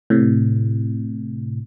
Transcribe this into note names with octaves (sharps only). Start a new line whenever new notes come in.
A2 C3